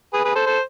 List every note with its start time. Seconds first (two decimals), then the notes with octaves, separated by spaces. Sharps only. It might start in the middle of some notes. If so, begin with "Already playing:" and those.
0.14 G#4 B4
0.25 G#4 B4
0.35 A4 C5
0.46 A4 C5